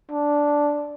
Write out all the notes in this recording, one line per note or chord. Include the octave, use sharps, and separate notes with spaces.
D4